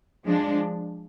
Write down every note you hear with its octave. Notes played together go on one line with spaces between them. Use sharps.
F3 G#3 D4